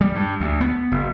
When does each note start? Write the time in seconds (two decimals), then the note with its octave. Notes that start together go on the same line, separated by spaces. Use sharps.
0.01 G3
0.15 G2
0.40 D2
0.61 B3
0.92 F#1